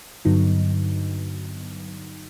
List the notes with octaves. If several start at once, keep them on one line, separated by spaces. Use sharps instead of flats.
G2 D3 F#3 B3 D#4